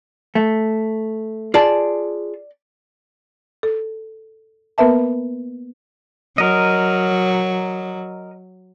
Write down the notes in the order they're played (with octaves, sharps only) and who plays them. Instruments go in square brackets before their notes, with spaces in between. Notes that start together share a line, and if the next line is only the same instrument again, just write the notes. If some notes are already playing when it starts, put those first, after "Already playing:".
[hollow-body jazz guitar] A3
[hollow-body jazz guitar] F4 G#4 A5 [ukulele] D5
[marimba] A4
A#3 B3 A#4 B4 E5 A5
[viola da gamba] F#3 [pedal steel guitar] A#4 D#5